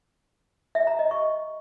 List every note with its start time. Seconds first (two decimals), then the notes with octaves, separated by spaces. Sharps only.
0.75 E5
0.87 A#5
0.99 D#5
1.11 C#6